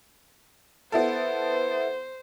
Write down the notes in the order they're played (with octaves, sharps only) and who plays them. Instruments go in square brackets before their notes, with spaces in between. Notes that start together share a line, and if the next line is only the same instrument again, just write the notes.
[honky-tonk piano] B3 E4 A4 [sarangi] C5